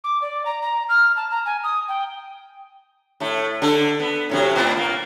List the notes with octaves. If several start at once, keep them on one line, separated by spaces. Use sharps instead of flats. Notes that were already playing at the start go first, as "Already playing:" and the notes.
D6
D5
A#5
A#5
F6
A5
A#5
G#5
D#6
G5
A2 A3
D3 A4
B3
A2 C3 F#3
A2 B3 C4
A#3